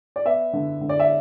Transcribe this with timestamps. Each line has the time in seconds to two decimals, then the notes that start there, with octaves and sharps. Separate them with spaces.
0.16 D5
0.25 B3 E5
0.53 D3
0.81 D3
0.89 D5
1.00 E5